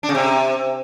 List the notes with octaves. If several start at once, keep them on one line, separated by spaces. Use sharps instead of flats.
D4
C#3
C3